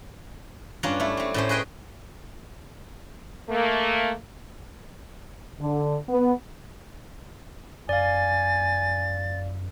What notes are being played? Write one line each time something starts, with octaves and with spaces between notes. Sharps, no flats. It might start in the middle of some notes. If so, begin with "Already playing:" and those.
G2 C#4 D4 F4 A#5
A3 E4
A3 C4
A2 C#4 C5
G#4 B4 D#5 G5 G#5
A3 A#3
D3
B3
F#2 D5 F5 G#5 A6